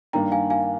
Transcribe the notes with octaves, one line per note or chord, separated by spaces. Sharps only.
G2 D#3 A#3 D4 G5 A#5
F5 G#5
F5 G#5